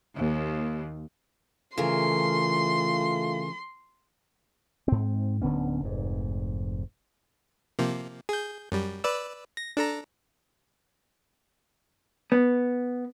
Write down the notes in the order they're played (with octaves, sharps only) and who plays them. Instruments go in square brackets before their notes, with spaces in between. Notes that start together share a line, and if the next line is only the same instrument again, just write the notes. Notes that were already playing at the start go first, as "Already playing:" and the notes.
[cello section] D#2
[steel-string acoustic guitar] C#3 E3 A#4 [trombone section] A3 F4 [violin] C6
[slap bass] G#2 C4
D1 D3 B3 C#4
F1 G#2
[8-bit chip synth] C3 F3 A#3
G#4 G6
F#2 G3
B4 D5 E6
A#6
D4 A4 A#5
[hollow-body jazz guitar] B3